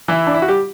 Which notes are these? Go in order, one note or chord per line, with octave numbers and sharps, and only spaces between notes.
E3 E4
D4
E4
F#4
G3 G4